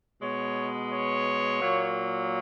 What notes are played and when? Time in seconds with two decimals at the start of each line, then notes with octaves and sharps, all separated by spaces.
0.21 B2 G#3 B3 C#5
0.91 C#5
1.60 A#2 F#3 A#3